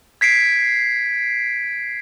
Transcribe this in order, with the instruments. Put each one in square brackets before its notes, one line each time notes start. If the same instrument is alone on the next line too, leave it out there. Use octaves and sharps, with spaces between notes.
[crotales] G#6 B6 C7 D7